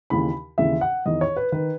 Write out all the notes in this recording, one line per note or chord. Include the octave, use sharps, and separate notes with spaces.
D#2 C#3 E3 B5
D#2 C#3 E3 E5
F#5
E2 D#3 D#5
C#5
B4
D#3 B4